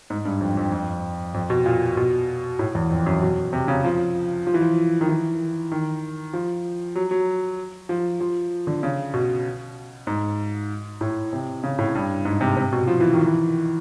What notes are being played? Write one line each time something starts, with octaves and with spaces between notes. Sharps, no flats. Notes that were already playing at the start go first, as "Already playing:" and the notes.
G#2
G2
F2
F2
F2
F2
B2
A#2
B2
A2
E2
F2
F#2
B2
C3
C#3
F3
F3
E3
F3
D#3
E3
D#3
F3
F#3
F#3
F3
F3
D3
C#3
B2
G#2
A2
C3
C#3
A2
G2
G#2
C3
C3
B2
F3
E3
D#3
E3